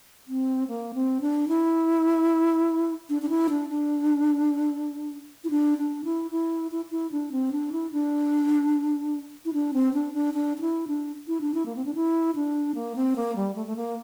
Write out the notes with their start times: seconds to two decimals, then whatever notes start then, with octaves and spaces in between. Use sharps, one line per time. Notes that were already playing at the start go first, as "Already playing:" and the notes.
0.28 C4
0.68 A#3
0.94 C4
1.21 D4
1.48 E4
3.09 D4
3.22 D4
3.29 E4
3.50 D4
3.69 D4
5.44 E4
5.51 D4
5.78 D4
6.05 E4
6.31 E4
6.72 E4
6.91 E4
7.12 D4
7.32 C4
7.52 D4
7.72 E4
7.92 D4
9.45 E4
9.53 D4
9.74 C4
9.94 D4
10.14 D4
10.34 D4
10.57 D4
10.61 E4
10.88 D4
11.28 E4
11.41 D4
11.54 E4
11.66 A#3
11.76 C4
11.85 D4
11.95 E4
12.36 D4
12.75 A#3
12.96 C4
13.16 A#3
13.36 G3
13.56 A3
13.67 A3
13.76 A#3